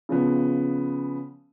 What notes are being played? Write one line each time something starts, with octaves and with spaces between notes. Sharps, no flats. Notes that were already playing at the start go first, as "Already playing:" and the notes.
C#3 F3 B3